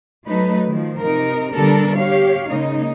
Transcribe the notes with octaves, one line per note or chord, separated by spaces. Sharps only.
F#3 A3 D#4 B4
D#3 F3
C3 D#4 A#4
D3 G3 B3 D4 A4 A#4
G4 C#5 F5
C#3 G#3 A#3 D#4